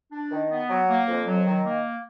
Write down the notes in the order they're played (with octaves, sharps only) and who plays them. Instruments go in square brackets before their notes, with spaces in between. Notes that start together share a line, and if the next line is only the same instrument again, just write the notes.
[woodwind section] D4
D#3
B3
F#3
A#3
F2
F#3
D#3
A#3